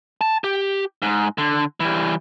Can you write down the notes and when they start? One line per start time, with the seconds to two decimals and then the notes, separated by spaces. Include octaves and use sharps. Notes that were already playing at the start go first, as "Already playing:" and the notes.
0.21 A5
0.44 G4
1.02 G#2
1.38 D3
1.80 E3 G3